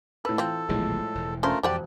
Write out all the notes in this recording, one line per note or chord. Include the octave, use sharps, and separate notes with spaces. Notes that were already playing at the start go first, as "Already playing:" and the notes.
A2 A4 B4 E6
E3 C4 F4
D#1 B1 A2 E3 F3 G#3
E1
A3 C#4 D4 F4 A#4 C5
E1 F2 F3 G4 C5 D5 F#5 G5